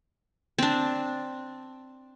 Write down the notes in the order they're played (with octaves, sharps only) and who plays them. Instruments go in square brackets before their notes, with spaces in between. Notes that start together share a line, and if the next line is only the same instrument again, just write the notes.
[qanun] C4 D4